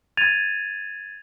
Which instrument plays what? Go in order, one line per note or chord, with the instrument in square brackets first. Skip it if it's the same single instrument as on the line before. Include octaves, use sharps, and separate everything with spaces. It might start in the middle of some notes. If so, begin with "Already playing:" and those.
[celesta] G#6 A6 D#7 F7